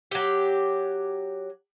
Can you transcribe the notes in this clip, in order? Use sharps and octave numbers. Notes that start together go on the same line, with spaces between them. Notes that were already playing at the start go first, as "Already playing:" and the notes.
F#3 G4